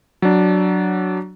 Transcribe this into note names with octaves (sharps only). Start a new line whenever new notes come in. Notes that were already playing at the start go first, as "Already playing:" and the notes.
F#3 D4